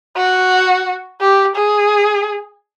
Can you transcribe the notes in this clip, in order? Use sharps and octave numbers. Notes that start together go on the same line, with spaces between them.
F#4
G4
G#4